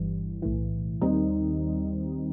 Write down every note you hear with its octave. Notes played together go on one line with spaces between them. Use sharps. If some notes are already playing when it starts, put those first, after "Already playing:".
Already playing: G1 G2 E3 G3
B1 A2 E3
D#2 D#3 G3 C4 D#4